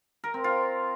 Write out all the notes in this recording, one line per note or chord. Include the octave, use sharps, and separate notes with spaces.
A#4
C4
F4